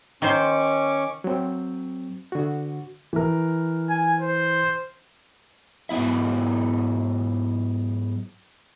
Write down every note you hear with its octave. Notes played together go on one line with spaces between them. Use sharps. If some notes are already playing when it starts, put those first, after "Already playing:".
D#3 C#4 C5 C#6 D6
F#3 C4
D3 F#4
E3 A#4
G#5
C5
G#2 F#3 B3 E4 E5